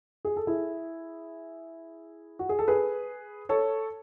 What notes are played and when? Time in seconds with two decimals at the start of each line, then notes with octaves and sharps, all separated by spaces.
0.25 G#4
0.37 A4
0.47 E4 G#4
2.39 F#4
2.49 G#4
2.59 A4
2.68 G#4 B4
3.49 A4 C#5